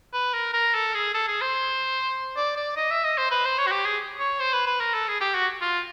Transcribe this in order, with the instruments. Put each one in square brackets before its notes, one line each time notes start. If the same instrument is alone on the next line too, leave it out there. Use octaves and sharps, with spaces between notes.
[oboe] B4
A#4
A#4
A4
G#4
A4
G#4
C5
D5
D5
D#5
E5
D#5
C5
B4
C5
C#5
F#4
G4
G#4
C#5
C5
B4
B4
A#4
A4
G#4
G4
F#4
F4